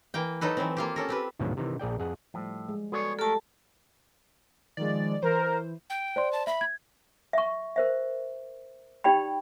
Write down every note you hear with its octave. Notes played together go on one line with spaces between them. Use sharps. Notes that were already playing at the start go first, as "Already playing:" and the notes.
E3 A#3 G5
F#3 D#4 A4 B4
E3 F#3 C4
A#3 F4 G4
C#4 A4 A#4
C4 G4 B4
D2 G#2 B2 D#3 F3 F#3
C3 D#3 E3
A#1 G#4 D5 G5
F2 G#4 F#5
A2 F3 G3
G#3
B3 F#4 G#4 A4 C#5 D5
A3 G4 A4 A#4 A5
D#3 F3 G#3 D5
E3 A#4 C5
G5
C5 D5 C6
A5
E5 B5
G#6
E5 C#6
A#4 C5 E5
D#4 G4 D5 G5 B5